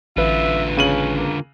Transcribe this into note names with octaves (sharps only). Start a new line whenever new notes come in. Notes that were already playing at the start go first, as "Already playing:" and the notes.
A1 D3 F4 B4 E5
C#3 C#4 D#7 F#7
A#3